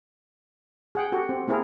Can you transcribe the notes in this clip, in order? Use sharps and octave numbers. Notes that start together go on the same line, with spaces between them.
G#4 F#5 G5
F#4 G4 A4
C4
A#3 C4 E4 G#4 A#4